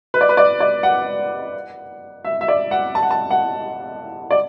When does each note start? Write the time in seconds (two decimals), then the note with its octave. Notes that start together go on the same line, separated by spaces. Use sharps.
0.14 B4
0.21 D5
0.29 B4
0.37 D5
0.60 D5
0.83 F#5
2.25 E5
2.41 E5
2.48 D5
2.71 F#5
2.95 A5
3.03 F#5
3.11 A5
3.31 F#5
4.31 D5